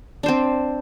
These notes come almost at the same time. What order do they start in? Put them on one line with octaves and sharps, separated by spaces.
D4 C5 C4